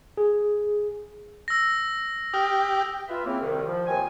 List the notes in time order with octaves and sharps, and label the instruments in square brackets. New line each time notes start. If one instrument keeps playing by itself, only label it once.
[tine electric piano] G#4
[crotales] E6 A#6
[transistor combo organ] G4 [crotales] D#6 F6
[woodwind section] F4 B4 E5
C#3 E3 A#3 C4
C2 D#3
F3
D#2 A#2 D#3 C4 G#5